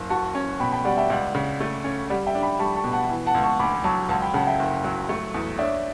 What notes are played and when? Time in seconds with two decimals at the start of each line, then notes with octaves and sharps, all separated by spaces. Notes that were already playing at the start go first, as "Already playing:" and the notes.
Already playing: F#1
0.09 F#4 A5 C#6
0.35 C#4
0.60 B2 G5 B5
0.72 G5 B5
0.85 G3 D5 F#5
0.97 E5 G5
1.10 C#2 D5 F#5
1.35 C#3
1.60 A3
1.84 C#4
2.09 G3 D5 F#5
2.26 E5 G5
2.35 D4
2.43 G5 B5
2.59 G3 A5 C#6
2.76 A5 C#6
2.84 B2
2.93 F#5 A5
3.09 E3
3.26 F#5 A5
3.35 C#2
3.43 A5 C#6
3.59 D2 B5 D6
3.84 F#3 A5 C#6
4.09 C#2 F#5 A5
4.22 G5 B5
4.34 C#3 F#5 A5
4.47 E5 G5
4.59 F#1
4.84 F#3
5.09 A3
5.34 E2
5.59 D4 C#5 E5